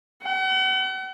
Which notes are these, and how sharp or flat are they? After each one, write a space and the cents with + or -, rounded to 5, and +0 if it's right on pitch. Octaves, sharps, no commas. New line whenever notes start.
F#5 +40